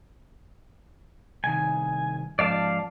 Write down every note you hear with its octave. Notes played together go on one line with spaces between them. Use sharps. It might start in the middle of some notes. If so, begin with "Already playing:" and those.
C2 D#3 G#5
G#2 F3 D5 F5 A5